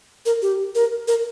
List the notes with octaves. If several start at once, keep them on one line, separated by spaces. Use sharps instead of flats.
A#4
G4
A#4
A#4